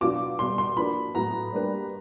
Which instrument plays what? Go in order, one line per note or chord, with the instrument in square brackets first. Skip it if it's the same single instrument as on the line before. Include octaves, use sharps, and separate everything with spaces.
[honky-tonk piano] B2 F#3 B3 D4 F4 [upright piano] D6
[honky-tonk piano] B2 G3 B3 [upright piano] C6
[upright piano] C6
[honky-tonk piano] F3 A#3 D4 F#4 B4 [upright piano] B5
[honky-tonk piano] A2 F#3 B3 [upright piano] A#5
[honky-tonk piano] G3 A#3 D4 G4 B4